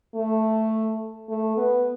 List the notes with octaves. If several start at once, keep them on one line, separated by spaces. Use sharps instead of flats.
A3
A3
B3